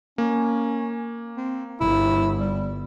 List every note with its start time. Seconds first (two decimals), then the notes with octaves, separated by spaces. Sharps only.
0.18 A#3 C#4
1.37 C4
1.80 G1 E4
2.39 G3